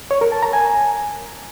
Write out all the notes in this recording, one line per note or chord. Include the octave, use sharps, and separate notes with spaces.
C#5
A#4
A5
A#5
G#5